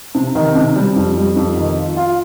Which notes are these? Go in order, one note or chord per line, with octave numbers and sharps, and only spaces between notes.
C3
D#3
C3
G3
F2
G3
F2
D#3
F4
F4